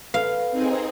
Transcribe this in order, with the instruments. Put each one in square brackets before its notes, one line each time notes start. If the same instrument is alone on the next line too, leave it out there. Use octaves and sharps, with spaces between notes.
[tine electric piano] A4 B4 [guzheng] F5
[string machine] C4 D#4 G#4